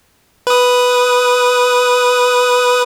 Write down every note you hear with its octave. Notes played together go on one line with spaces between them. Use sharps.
B4 D#6